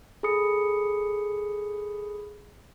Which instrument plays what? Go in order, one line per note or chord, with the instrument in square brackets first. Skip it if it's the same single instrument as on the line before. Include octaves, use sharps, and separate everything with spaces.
[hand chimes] G#4 A4 B5 D#6 C#7